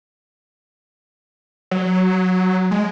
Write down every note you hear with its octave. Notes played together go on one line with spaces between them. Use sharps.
F#3
G#3